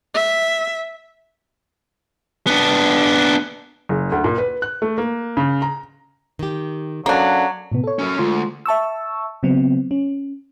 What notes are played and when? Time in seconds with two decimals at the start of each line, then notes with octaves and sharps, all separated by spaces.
0.14 E5
2.47 B3 D4
3.89 F#1
4.12 D2
4.24 A#2
4.38 B4
4.62 F#6
4.82 A3
4.98 A#3
5.37 C#3
5.62 A#5
6.39 D#3 G4
7.06 F#3 A#3 C#4 D4 F#4 A4
7.72 A2 C3 B3
7.84 A4 C#5
7.99 F#2 C#4
8.18 D2 G#3 F4 C6
8.66 E5 A5 C#6 E6
9.43 C#3 F#3 B3 C4
9.91 C#4